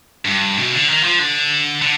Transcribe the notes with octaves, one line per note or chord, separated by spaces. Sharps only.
G2
B2
D3
D#3
F3
D3
D3